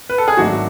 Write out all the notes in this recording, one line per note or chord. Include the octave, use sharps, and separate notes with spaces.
B4
A4
G#4
G#1 G#2 F#3 A3 D4 F#4